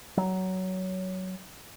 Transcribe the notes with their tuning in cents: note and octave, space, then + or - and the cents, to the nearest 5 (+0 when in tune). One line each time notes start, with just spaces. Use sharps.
F#3 +15